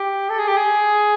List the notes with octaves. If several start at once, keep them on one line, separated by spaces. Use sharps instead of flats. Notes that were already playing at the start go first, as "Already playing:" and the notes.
Already playing: G4
A4
G#4
G4
G#4